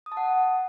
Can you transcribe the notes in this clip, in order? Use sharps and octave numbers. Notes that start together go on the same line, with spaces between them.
D#6
A5
F#5